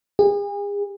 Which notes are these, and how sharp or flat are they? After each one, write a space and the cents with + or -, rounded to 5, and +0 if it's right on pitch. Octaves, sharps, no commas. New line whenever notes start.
G#4 -40